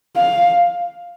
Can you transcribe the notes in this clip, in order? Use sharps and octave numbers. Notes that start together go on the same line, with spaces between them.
F5